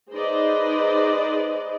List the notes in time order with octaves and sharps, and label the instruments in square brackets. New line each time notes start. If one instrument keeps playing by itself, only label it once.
[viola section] D#4 G#4 B4 C5 D5 D#5